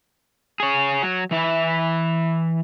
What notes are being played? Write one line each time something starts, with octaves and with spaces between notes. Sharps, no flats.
G#4 C#5
F#3
E3 E4 B4